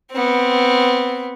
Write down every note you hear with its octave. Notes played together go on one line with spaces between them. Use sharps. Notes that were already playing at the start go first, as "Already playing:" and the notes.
B3 C4